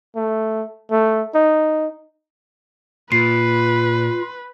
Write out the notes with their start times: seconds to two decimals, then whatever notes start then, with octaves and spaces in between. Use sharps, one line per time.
0.16 A3
0.91 A3
1.35 D#4
3.12 A#2 F4 B4 C7